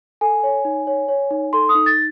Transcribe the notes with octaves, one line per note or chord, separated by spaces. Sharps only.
A4 G#5
C#5
D#4
C#5
C#5
D#4
A4 C6
D#6
D#4
A6